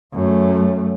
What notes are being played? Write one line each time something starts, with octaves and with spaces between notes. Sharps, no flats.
F#2 A3